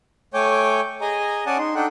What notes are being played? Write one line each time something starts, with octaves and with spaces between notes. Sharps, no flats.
A3 C#5 G5 G#5 D6 G6
G#4 D#5 G#5 A#5
C#4 D5 F#5 G#5 A5 D#6
D#4 C6
D4 D#4 A4 F#5 G5